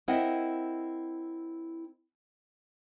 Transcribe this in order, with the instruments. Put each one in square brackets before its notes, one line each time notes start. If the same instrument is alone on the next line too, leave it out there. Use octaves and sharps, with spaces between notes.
[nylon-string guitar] C4 E4 A#4 D#5 E5 F#5